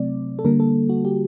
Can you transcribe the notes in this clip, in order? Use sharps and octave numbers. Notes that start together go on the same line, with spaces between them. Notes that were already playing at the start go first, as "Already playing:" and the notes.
Already playing: C3 F#3 A3 C4 D5
A4
D3 G3 A#3 A#4
A4
F#4
G4